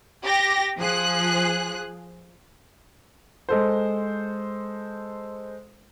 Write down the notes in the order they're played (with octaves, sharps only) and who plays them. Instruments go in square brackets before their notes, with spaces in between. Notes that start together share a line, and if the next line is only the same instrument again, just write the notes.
[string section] G4 A#6
F3 G#4 F#6
[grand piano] G#3 A4 C5